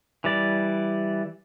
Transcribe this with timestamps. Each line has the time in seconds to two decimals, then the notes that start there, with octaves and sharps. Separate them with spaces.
0.24 E3 G3 D5